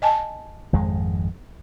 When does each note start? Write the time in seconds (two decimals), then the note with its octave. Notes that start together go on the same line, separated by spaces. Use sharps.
0.02 D#5 G#5 A5
0.73 G#1 F2 G#3